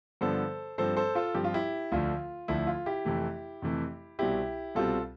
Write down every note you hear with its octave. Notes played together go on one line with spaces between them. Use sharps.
G2 D3 F3 B3 A4 C5
G2 F3 C4 A4 C5
A4 C5
F4 A4
G2 F3 C4 G4
F4
E4 G4
D2 D3 F3 A3 F4
D2 D3 F3 A3 E4
F4
E4 G4
F2 C3 E3 A3
F2 C3 E3 A3
C2 B2 G3 C4 E4 G4
C2 B2 G3 C4 F4 A4